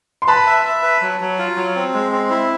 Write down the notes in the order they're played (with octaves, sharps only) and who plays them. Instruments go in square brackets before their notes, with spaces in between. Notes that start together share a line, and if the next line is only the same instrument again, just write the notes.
[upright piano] C6
[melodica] B4 [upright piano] A5 B5
[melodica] E5
E5
B4
F#3
F#3
F4
F#3
C4
G#3
C4
E4